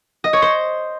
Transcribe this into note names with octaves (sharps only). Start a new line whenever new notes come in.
D#5
C#5
C5